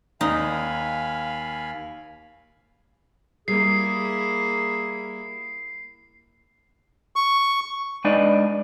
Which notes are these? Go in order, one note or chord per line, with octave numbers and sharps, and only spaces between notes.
D#2 D#4 F5 G#5 B5
G3 A#3 E4 G#4 C7
C#6
G#3 D4 D#4 B4 D5 D#5